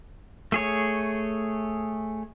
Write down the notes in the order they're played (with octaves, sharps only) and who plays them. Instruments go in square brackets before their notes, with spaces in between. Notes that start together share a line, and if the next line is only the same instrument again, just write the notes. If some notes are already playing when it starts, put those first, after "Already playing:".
[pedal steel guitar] A3 G#4 C#5